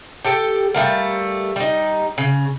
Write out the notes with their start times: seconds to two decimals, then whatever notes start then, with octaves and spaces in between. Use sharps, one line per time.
0.25 G4 A4 G5
0.74 G3 A3 A#3
1.56 G3 D#4
2.18 C#3